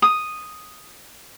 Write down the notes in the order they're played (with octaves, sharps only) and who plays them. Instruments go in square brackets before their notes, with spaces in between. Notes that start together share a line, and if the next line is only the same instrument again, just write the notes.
[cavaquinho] D#6